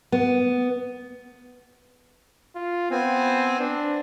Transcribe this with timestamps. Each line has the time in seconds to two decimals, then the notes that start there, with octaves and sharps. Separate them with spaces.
0.12 B3
2.56 F4
2.91 B3 C4 G#5
3.60 D4